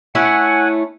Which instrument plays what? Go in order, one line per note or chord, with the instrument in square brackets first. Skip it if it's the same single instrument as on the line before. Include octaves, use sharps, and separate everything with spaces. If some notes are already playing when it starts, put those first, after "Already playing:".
[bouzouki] A3 C#4 E4 [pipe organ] F#5 G#5